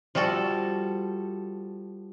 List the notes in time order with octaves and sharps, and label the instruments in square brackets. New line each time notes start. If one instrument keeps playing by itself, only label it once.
[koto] F3 G3 F#4 A4